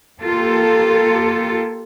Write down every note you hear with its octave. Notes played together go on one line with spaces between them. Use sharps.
A#3 F4 G4 A4